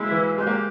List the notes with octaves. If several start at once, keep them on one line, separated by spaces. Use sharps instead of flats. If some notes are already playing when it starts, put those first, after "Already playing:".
Already playing: G#3 A#3 E4
E3
G#3 G4
A#3